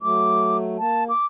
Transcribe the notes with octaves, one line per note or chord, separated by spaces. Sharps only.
F#3 A3 D6
A#3 A5
D6